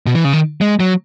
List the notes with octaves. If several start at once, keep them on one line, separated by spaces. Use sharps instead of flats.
B2
E3
C#3
D#3
G#3
F#3